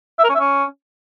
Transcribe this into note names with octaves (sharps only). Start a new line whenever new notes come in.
E5
A#4
C#4
E5
C#4